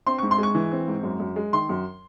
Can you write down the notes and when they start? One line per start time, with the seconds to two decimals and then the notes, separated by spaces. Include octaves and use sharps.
0.06 C4 C6
0.18 C#6
0.23 G#2
0.31 C6
0.38 G#3 C#6
0.55 E3
0.72 C4
0.88 G#2
1.03 F#2
1.20 F#2
1.36 G#3
1.53 D#3 C6
1.69 F#2